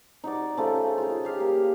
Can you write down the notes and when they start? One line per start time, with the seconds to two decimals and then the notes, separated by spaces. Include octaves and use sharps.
0.24 D#4 F#4 D5
0.57 C#3 A3 F4 C5
0.98 F4 G#4
1.25 G4 E5 F5
1.40 A#3